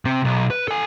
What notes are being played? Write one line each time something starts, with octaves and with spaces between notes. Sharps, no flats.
C3 C4
B1
B4
A4 G#5